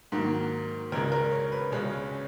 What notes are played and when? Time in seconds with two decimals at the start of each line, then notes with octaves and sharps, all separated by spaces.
0.12 G#2 D#3 F#3 A#3
0.92 C#2 C#3 G#3 A#4
1.12 A#4
1.32 C#5
1.52 B4
1.71 C#2 C#3 G#3 C#4
2.12 C#4